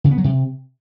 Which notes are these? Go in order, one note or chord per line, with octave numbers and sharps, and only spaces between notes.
C#3
B3
F#3
C3